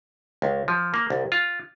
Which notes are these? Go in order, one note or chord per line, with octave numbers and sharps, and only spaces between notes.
C#2
F3
A#3
C2
F4